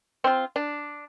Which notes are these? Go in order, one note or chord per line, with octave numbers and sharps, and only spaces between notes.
C4 F4
D4